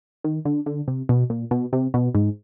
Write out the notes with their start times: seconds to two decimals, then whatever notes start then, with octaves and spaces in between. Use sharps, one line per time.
0.24 D#3
0.45 D3
0.66 D3
0.88 C3
1.09 B2
1.30 A#2
1.51 B2
1.73 C3
1.94 B2
2.15 G#2